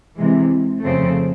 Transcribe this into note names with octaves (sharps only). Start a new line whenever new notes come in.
C3 E3 G#3
F2 C#3 F3 A3 C4